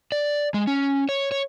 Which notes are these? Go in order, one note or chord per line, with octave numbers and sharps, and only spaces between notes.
D5
G#3
C#4
C#5
C#5